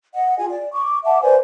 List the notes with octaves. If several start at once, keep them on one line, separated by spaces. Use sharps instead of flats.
D#5 F#5
F4 G#4 G#5
D5
C#6 D6
E5 F#5 A5 D6
B4 C5 D5 G#5